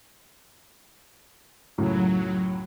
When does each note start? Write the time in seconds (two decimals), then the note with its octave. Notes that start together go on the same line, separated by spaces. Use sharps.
1.78 C#2 F#2 A2 F#3